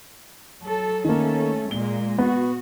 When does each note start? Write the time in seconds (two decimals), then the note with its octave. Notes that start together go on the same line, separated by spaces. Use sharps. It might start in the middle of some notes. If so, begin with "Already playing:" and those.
0.62 F#3 A4
1.04 D#3 A3 A#3 C#4 A4
1.71 A#2 G#3 A#3 G7
2.18 B3 F#4